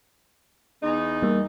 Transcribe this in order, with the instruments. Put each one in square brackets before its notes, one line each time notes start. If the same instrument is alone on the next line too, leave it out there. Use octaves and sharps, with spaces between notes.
[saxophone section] E2 D#4
[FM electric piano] G3 A#3